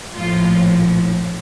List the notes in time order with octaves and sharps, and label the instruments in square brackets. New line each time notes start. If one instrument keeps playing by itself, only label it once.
[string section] A#1 A2 F3 F4